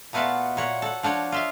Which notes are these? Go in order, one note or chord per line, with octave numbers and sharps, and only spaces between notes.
A#2 A3 B3 F4 F#4 A5
A#2 C#5 F#5
A4 F#5
F3 D4 F#4 C#5
F4 E5 F5